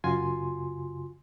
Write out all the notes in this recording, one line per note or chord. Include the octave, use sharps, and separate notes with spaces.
F#2 C#3 F4 F#4 G#5 C6